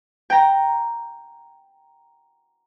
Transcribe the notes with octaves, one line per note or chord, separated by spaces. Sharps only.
G5 A#5